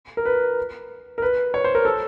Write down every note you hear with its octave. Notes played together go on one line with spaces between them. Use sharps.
A#4
B4
A#4
B4
C#5
C5
A#4
A4